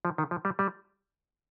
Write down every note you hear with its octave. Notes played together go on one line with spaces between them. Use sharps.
F3
D#3
F3
G3
G3